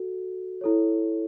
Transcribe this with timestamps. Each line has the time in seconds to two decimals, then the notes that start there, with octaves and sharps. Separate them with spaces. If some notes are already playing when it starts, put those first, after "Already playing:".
Already playing: F#4 A4
0.61 E4 A4 C#5